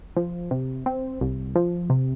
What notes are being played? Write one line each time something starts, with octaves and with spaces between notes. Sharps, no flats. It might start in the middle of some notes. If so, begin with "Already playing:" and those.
F3
C3
C4
C2
F3
C3